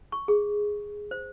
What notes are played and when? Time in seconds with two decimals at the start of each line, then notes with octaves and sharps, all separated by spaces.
0.12 C#6
0.28 G#4
1.11 C5